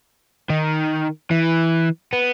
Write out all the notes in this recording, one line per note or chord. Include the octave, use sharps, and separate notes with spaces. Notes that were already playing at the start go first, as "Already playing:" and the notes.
D#3
E3
B3